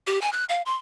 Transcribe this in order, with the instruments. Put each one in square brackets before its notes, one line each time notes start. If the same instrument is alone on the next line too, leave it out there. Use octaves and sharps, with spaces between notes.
[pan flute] G4
G#5
F#6
F5
C6